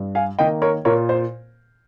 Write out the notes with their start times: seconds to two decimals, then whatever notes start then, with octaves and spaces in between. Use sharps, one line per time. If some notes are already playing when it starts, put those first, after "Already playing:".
Already playing: G2
0.15 F5 G#5
0.39 D#3 A#3 D#5 G5
0.62 A#4 C#5
0.85 A#2 A#4 C#5
1.09 C5